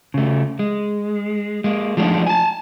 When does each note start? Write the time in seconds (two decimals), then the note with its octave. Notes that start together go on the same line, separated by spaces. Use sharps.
0.14 C#3 A3
0.59 G#3
1.64 G#3 A#3
1.97 F3 G#3 A3 B3 D4 D#4
2.27 G#5 A5